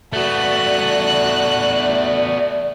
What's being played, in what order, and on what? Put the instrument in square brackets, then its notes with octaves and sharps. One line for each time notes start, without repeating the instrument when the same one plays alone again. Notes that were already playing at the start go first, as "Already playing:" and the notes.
[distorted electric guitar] A3 B3 [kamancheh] F#4 F#6 [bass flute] D5